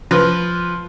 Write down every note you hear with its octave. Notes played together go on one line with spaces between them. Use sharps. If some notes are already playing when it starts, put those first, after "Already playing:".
F3 B4